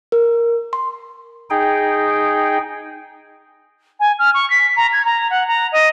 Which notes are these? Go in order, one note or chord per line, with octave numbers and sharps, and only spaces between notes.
A#4
C6
D#4 G#4 G5
G#5
F6
C#6
B6
A#5
G#6
A#5
F#5
A#5
D#5